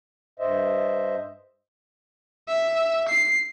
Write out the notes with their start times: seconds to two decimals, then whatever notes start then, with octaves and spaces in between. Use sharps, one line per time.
0.40 G2 C5 D#5 E5
2.48 E5
3.09 C7